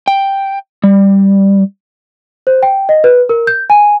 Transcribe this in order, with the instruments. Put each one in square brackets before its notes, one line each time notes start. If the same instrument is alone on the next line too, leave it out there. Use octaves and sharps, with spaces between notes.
[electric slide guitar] G5
G3
[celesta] C5
G5
D#5
B4
A#4
G6
G#5